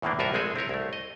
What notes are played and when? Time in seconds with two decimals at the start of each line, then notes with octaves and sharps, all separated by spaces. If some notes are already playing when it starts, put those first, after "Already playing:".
0.02 E2 A2 D#3 E3 A#3 D4
0.19 C2 A2 F4 F#4 A#4 E5
0.34 A#1 G#3 C4 G#4 A4 G#5
0.56 C4 E4 A#4 C#5
0.69 C2 A3
0.93 D#5